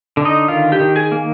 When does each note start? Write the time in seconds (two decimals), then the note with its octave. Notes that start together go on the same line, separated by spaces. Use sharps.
0.17 D3
0.25 D#4 D#5
0.48 D#3 F4 F5
0.72 G4 G5
0.80 D#3
0.96 G#4 G#5
1.12 A#3